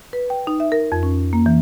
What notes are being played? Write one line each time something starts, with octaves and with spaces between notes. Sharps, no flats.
B4
G5
D#4
E5
A#4
F2
C#4
A#3
E3